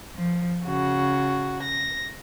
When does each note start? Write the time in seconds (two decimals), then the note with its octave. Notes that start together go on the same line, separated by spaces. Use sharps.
0.16 F3
0.64 C#3 F#4
1.63 A#6